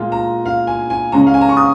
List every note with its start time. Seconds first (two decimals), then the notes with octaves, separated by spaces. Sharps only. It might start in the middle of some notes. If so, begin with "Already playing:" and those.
Already playing: A#2 G#3 F4
0.12 A#5
0.45 F5
0.67 G#5
0.90 G#5
1.12 C#3 G#3 C#4 A#5
1.27 F5
1.34 G#5
1.41 A#5
1.49 C#6
1.57 D#6